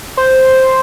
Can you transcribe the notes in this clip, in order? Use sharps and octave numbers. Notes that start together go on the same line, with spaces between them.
C5